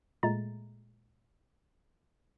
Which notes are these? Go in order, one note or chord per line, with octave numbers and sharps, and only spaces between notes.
A#2 G#3 A3 A#5 A6